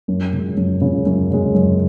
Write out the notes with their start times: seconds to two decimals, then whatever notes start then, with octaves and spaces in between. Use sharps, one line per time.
0.08 F#2
0.33 C#3 G#3
0.57 F#2
0.81 C#3 G#3
1.06 F#2
1.30 C#3 G#3
1.54 F#2